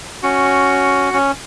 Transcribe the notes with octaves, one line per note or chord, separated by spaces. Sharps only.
C#4 F#4
C#4